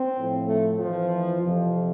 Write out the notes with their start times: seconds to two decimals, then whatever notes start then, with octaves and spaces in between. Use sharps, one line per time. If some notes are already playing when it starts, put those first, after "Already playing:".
Already playing: C4
0.16 A2 F3
0.47 A3
0.79 F2 E3 F3
1.41 F2 C3 F3